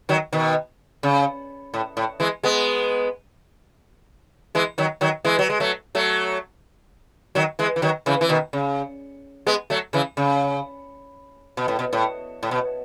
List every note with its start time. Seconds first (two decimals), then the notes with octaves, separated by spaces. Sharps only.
0.09 D#3 F#3
0.32 B2 D#3
1.03 C#3
1.74 A2
1.97 A2
2.20 E3 G#3
2.43 G#3 B3
4.55 E3 G#3
4.78 D#3 F#3
5.01 D#3 F#3
5.25 E3 G#3
5.39 F#3
5.50 G#3
5.60 F#3 A3
5.95 F#3 A3
7.35 D#3 F#3
7.59 E3 G#3
7.76 E3
7.82 D#3 F#3
8.06 C#3 E3
8.21 E3
8.29 B2 D#3
8.53 C#3
9.47 G#3 B3
9.70 F#3 A3
9.93 C#3 E3
10.17 C#3
11.57 B2
11.68 A2
11.79 B2
11.93 A2
12.43 A2
12.51 B2